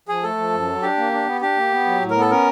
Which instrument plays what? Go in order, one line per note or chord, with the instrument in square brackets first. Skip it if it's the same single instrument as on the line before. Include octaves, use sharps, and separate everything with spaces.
[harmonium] F3 [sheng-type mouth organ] G#4
[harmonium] A3 [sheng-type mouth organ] A4
[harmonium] F3
F#2
F#3
[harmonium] D4 [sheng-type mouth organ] G4
[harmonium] A#3
D4
B3
[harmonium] D4 [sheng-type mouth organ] G4
[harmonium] A#3
B3
F#3
A2
[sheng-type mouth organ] A#4
[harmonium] B3 [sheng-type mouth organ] A4
[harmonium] C#4 [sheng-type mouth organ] A#4